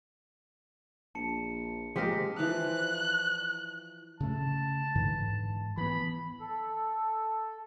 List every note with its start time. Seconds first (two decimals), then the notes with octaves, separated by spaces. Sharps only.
1.15 A#1 A5 C#7
1.96 F3 G#3 A#3 C4 G4 A#4 D#6 B6
2.39 E3 F3 F5 F#6
4.20 C#3 A3 A5
4.95 G#2 D3 E3
5.77 E3 B3 B5
6.41 A4